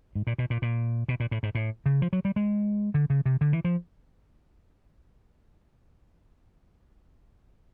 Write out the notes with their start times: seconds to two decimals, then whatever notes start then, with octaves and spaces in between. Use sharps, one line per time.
0.15 G#2
0.27 A#2
0.38 B2
0.50 A#2
0.62 A#2
1.08 B2
1.20 A#2
1.31 A2
1.43 G#2
1.55 A2
1.86 C#3
2.02 F3
2.13 F#3
2.25 G3
2.36 G#3
2.94 D3
3.10 C#3
3.26 C3
3.41 D3
3.53 E3
3.64 F3